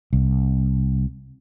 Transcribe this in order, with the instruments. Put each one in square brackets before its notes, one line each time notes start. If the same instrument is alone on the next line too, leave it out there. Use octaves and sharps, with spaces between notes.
[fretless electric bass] C2